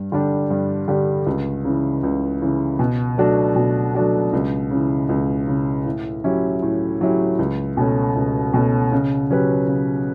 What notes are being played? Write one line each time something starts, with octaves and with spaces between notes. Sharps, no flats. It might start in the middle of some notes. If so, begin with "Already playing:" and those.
Already playing: G2
D3 G3 D4 G4
G2
D3 G3 D4 G4
C#2
C#3 E3
C#2
C#3 E3
B2
F#3 A3 D4 F#4
B2
F#3 A3 D4 F#4
C#2
C#3 E3
C#2
C#3 E3
A2
F#3 C#4 E4 G4
A2
F#3 C#4 E4 G4
C#2
B2 A3 C#4
C#2
B2 A3 C#4
C#3
F#3 C#4 G4 B4
C#3